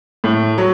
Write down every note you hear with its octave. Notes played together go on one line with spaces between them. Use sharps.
A2
F#3